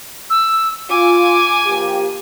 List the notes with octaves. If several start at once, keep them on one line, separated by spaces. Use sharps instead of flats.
E6
F4 G#5 D6
F3 A#3 G4